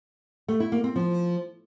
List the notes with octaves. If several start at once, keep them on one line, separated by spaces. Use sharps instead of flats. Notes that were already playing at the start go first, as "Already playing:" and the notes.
A3
E4
A#3
C4
F3